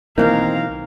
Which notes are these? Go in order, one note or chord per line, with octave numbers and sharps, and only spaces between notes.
B1 D#3 E3 A#3 C4 D#4 A#4 F5